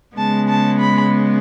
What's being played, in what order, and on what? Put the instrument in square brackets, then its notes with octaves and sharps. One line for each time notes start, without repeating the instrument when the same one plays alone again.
[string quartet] C#3 G#3 B3 A5
A5
B5